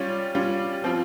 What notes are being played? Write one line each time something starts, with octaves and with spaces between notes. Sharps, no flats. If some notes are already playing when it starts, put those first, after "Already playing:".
Already playing: G3 C#4 F4
G3 C#4 F4
F3 C4 F4